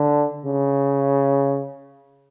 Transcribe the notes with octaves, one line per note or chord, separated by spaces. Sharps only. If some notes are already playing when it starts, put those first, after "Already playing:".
Already playing: D3
C#3